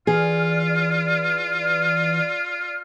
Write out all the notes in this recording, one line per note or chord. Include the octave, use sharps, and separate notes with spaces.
E3 F4 G#4 D5 F6